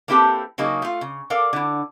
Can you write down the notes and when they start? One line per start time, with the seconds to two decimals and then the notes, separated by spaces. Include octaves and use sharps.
0.08 A#3 C4 E4 G4 A4 B4
0.58 C#3 F#3 A#3 D#4 G#4
0.82 A3 F4
1.01 C#3
1.30 A4 A#4 D5 F5
1.53 D3 E4